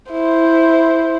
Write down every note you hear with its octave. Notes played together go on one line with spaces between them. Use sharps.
E4 C5